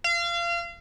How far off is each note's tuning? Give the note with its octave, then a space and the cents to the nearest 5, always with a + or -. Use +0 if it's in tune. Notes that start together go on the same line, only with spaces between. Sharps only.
F5 -30